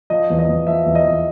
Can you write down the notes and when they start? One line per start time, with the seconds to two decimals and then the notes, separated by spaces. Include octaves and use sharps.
0.10 F3 D#5
0.30 E2
0.39 D#5
0.48 E2
0.67 F3 E5
0.86 E2
0.95 D#5
1.05 E2